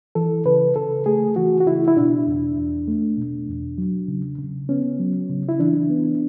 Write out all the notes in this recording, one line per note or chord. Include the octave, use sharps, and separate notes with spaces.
E3 A4
C#3 B4
C#3 A4
A3 G#4
E3 F#4
F#4
C#3 E4
E4
B2 D4
E2
E2
A3
B2
E2
F#3
C#3
C#3
B3 C#4
F#3
C#3
E4
E3 D4
B3